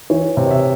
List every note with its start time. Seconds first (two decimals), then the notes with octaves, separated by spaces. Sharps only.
0.10 E3 C#5
0.37 C3
0.46 C#5
0.51 E5